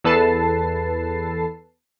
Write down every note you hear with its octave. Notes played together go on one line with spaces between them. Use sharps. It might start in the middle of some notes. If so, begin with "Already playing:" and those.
E2 A4 B4 A5 C7